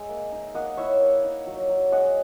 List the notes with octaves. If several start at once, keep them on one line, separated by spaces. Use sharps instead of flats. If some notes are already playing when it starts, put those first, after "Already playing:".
Already playing: G#3 E5
A#3
D#4
A#3 D#5 F#5
E4 C#5 E5
A#3
D#4
F#3
F#3
G#3 D#5 F#5